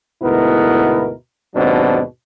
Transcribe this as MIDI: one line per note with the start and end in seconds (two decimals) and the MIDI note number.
0.22 1.12 38
0.22 1.12 44
0.22 1.12 47
0.22 1.12 59
0.22 1.12 64
0.22 1.12 70
1.55 2.01 39
1.55 2.01 44
1.55 2.01 47
1.55 2.01 54
1.55 2.01 60
1.55 2.01 62